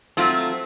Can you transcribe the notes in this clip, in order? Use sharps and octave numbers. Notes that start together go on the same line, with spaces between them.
F#3 A3 C4 F4